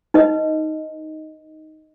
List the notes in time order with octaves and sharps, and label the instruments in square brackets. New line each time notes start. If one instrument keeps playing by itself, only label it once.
[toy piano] D#4 B4 D#5